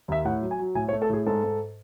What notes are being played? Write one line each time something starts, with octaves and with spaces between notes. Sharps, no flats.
D#2 E5
A2 F#5
F#3
G#5
F#3
A2 G#5
C#5
A3
A4
A2 G#4
G#2 A4
G#2